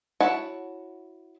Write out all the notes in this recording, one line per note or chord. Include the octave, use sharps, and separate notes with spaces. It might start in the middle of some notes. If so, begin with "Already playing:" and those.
E4 F#4 C#5 F#5 A5